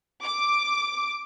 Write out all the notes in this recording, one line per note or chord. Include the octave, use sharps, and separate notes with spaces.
D6